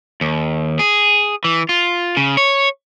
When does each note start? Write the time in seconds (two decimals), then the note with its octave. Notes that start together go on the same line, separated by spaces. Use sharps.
0.21 D#2
0.79 G#4
1.44 E3
1.69 F4
2.17 C#3
2.37 C#5